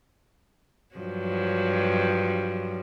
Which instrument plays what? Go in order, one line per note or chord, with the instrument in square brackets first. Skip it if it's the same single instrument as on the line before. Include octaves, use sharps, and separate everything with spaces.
[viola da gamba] G2 F3 F#3